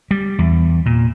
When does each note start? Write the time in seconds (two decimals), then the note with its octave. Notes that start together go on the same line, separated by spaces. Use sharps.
0.11 G3
0.39 E2
0.86 A#2